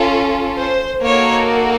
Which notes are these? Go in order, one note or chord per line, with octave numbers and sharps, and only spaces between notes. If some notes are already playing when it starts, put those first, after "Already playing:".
Already playing: C#4 F4 A4
C5
A#3 D#4 F#4 A4 C#5